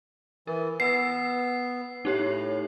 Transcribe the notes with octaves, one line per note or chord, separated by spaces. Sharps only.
E3 A#4
B3 B4 B5 E6 C7
A2 D#4 G4 C#5